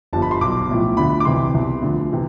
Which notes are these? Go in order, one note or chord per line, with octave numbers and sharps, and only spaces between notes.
G1 G2 F3 A5
B5
C6
B1 B2 D6
B1 A2 F3
D2 D3 F3 B5
D6
C2 C3 E3 C6
C2 B2
D2 D3 F3
C3 E3